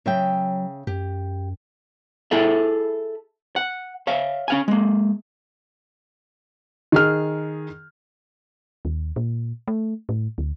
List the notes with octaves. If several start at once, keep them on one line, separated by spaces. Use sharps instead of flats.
C#3 F#3 E5 G5
F#2 G4
E4 G#4 A4 E5
F#5
C#5 E5 F5
C#4 F5 G#5
G#3 A#3
D#3 G#4 F6
D#2
A#2
A3
A2
D2